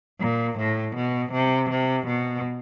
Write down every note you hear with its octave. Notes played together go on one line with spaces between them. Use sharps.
A#2
A2
B2
C3
C3
B2